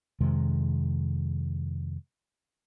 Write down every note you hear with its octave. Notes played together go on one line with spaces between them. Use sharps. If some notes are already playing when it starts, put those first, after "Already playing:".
F2 C3 D#3 G#3